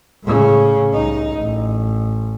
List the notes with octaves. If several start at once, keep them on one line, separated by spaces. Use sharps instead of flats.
A2 C#3
C2 D#4
A1